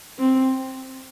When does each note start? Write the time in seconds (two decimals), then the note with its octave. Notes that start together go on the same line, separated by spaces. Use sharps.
0.19 C4